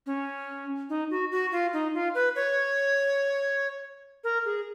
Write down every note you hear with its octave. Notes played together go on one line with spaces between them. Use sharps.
C#4
D#4
F#4
F#4
F4
D#4
F4
B4
C#5
A#4
G#4